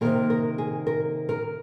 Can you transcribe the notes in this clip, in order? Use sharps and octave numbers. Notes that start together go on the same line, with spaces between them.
C3 D#3 A#3 A#4
A#4
G#4
A#4
A#4